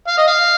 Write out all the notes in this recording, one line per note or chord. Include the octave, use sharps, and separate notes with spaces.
F5
D#5
F5